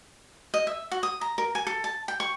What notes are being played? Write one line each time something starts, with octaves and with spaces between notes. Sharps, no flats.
D#5
E5
F#4
D#6
A#5
A#4
G#5
A4
A5
G5
C#6